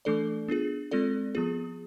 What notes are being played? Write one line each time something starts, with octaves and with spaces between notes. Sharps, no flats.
E3 A3 D4 A4 D5
B3 D4 F4 G#4
G#3 C4 F4 A4 D5
F3 B3 F4 G#4